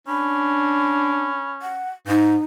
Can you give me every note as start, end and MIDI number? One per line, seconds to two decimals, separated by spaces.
0.07 1.85 61
0.07 1.43 62
0.07 1.51 83
1.62 1.90 78
2.07 2.37 44
2.07 2.44 63